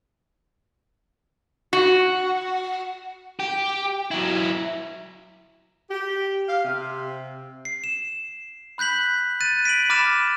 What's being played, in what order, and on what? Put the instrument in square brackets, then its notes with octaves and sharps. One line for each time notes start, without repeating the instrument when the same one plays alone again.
[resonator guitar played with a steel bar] F#4
[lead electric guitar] G4
F#3 E4
[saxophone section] G4
F5
C3
[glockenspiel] C7
E7
B5 F#6 G6 B6 F#7
F#6 A6 D#7
B6 D7 D#7 F#7
B5 D6 F6 A6 D7 E7